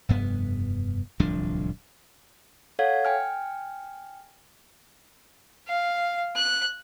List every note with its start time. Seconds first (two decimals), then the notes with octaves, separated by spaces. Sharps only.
0.09 F1 G2 B3
1.20 D1 C2 F3 D4
2.79 A4 C#5 F5 F#5 G#6
3.05 G5 G#5 F6
5.67 F5
6.35 F#6